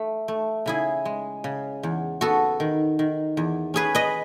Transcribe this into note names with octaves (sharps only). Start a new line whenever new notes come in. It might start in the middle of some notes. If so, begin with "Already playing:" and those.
Already playing: A3
A3
C#3 E4 G#4
G#3
C#3
E2
B3 F#4 A4
D#3
D#3
E2
C#4 G#4 B4
B4 D#5